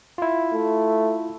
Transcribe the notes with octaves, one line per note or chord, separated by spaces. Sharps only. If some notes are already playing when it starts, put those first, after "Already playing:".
E4 F4
A3